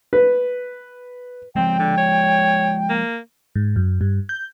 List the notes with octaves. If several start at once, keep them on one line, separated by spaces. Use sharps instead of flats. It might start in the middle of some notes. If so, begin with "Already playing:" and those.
B4
F3 G#3 C4 G5
D3
C#5
A#3
G#2
F#2
G2
G6